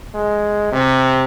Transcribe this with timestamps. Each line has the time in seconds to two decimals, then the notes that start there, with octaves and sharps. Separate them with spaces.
0.15 G#3
0.72 C3